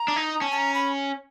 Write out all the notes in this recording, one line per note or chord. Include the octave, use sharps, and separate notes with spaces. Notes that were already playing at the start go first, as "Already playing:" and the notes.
Already playing: A#5
D4
D#4
C#4 A5
A5
A#5
B5